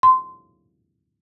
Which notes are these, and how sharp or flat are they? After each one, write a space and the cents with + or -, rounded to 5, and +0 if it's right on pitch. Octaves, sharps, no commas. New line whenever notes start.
C6 -15